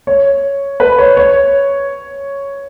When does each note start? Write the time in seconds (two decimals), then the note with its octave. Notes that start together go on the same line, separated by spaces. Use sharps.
0.07 C#5
0.80 B4
0.98 C#5
1.17 C#5